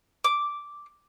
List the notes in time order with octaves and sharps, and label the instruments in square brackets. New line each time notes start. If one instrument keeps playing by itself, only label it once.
[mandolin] D6